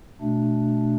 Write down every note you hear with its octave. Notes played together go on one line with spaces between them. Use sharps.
B2 A3 D4